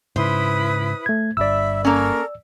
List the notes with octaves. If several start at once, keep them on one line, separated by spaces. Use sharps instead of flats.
G#2 C#3 E4 B4 C5 D#6
A3 G#6
G1 G2 D5 E5 B5 E6
A#3 C#4 A4 A#4